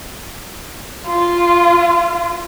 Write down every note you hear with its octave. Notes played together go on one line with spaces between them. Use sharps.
F4